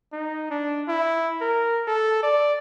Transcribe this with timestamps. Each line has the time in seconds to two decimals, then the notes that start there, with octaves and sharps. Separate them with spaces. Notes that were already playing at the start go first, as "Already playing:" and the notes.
0.13 D#4
0.50 D4
0.88 E4
1.41 A#4
1.87 A4
2.23 D5